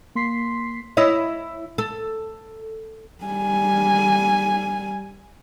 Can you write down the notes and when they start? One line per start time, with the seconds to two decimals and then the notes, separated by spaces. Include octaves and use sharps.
0.15 A#3 C6 B6 C7
0.97 E4 C#5 D#5
1.78 A4
3.25 G3 G#5